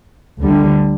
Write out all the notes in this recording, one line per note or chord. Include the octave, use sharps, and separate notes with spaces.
D2 D3 G3